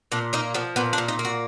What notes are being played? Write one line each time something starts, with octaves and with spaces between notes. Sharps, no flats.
A#2 D4
A#3 D#4
F3 B3
A#2 B3
D4
A#2
D#4
A#3
F#4